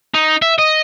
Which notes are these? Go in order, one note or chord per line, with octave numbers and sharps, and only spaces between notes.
D#4
E5
D#5